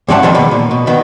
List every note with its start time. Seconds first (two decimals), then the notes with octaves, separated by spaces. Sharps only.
0.08 G2 E3 C4 C#4 F#5 A5
0.22 B2 D#3 F3 G#3
0.34 D#2 B2
0.51 A#2
0.71 B2
0.87 B2 D#3 B3